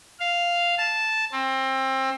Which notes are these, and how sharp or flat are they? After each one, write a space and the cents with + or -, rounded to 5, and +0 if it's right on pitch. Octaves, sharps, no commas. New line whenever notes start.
F5 -5
A5 -5
C4 +25